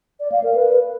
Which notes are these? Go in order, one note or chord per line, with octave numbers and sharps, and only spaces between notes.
D5
F5
A#4
B4